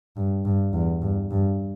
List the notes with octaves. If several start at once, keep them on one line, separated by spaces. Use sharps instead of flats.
G2
G2
E2
G2
G2